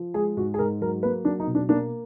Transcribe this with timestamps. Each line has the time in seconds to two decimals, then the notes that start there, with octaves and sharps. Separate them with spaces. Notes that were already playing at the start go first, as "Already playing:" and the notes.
Already playing: F3
0.14 G#3 G#4
0.37 G#2 F#4
0.54 G#4
0.59 G#2 A#4
0.81 F#3 A#4
1.03 A#3 B4
1.25 F#3 D4
1.40 D#4
1.47 B2
1.55 D4
1.69 A#3 D4